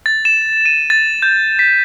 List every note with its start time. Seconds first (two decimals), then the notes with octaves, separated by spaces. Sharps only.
0.06 A6
0.25 E7
0.66 D#7
0.90 A6
1.22 G6
1.59 B6